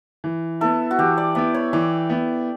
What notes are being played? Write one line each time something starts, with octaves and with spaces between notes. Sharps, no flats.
E3
B3 E4 A4
F#4
E3 G4
D5
B3 E4 D5
C#5
E3 D5
B3 E4